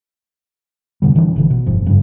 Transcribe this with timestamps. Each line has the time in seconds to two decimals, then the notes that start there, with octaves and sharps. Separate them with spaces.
1.02 E2 B2 D3 G3
1.15 B2 D#3 E3 C#4
1.36 A1 C#3 E3
1.50 B2
1.66 G1 F2 B2 F3
1.86 G2 C#3